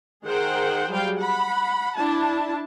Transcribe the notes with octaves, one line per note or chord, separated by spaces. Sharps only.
D#3 G#4 A#4 C5 F#5 G5
F#3 G3 G#4 F5 G5
F#5 B5
D4 E4 A5